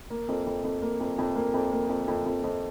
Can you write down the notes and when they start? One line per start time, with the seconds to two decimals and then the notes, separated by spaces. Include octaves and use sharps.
0.10 A#3
0.28 F2
0.46 F2
0.64 F2
0.82 A#3
1.00 F2
1.18 F2
1.36 A#3
1.54 F2
1.72 A#3
1.89 F2
2.08 F2
2.26 F2
2.44 F2